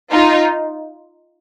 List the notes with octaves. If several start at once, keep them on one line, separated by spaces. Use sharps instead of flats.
D#4 F4